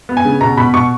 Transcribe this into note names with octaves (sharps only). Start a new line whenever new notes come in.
B3
G#5
C#3
B2 A#5
B2 B5
B2 C#6